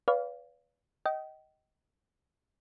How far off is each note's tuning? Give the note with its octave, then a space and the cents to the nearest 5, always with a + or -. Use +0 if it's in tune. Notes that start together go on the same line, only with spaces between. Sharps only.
B4 +0 D5 -45 F5 +0
D#5 +10 G5 -30